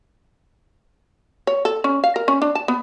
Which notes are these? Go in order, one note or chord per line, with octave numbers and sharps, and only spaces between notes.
C#5
A4
C#4
F5
A#4
C#4
D4
A5
B3